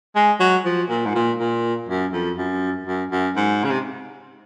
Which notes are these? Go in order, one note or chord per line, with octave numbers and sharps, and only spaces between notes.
G#3
F#3
F3
A#2
G#2
A#2
A#2
F#2
F2
F#2
F#2
F#2
G#2
C#3
C3